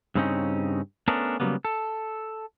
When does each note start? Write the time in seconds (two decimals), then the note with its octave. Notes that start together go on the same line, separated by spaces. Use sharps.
0.15 G2 C#3 C4 C#4 D#4
1.08 A3 B3 C#4 D4 A4 A#4
1.40 C#3 F#3 G3 A#3 B3
1.65 A4